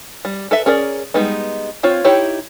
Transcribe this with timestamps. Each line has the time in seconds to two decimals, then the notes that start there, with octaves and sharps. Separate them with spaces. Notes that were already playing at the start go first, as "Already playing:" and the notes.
0.25 G3
0.51 A4 B4 E5
0.66 C#4 G#4 A#4 D5
1.14 G3 G#3 B3 D#4
1.83 C4 F4 C#5
2.04 D#4 E4 G4 C#5 G5